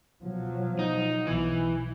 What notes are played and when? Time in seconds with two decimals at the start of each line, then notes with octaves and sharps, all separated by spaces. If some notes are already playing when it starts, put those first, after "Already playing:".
0.24 B2 F3 F#3
0.79 D#4
1.27 B1 E3